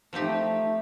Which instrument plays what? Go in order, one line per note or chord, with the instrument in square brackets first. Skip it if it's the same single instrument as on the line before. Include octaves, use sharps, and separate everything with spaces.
[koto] F3 C4 D#4 G4 [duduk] A3